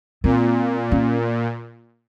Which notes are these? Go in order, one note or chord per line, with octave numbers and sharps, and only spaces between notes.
A#2 C4
C#4